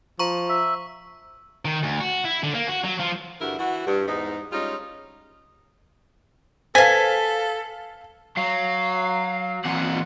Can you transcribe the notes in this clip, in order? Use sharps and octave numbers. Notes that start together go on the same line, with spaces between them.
F3 A#5 C#6
E5
D#3
D2
F#4
E4
D3
A#3
F#4
F#3
F3
G2 D3 E4 F#4 A#4
E3 F#4
G2
E2 G#2 D#4
G3 G#3 C#4 D#4 F4
A4 B4 C5 F5 G#5 A5 B6
F#3 F5
A#2 E3 C4 F#5